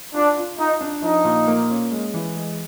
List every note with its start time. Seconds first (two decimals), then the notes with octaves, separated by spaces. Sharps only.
0.14 D4 F4
0.37 F4
0.58 D#4 F4
0.81 D4
1.02 F3 D#4
1.24 A#2
1.47 A#3
1.69 C#4
1.91 G#3
2.14 E3
2.36 G#3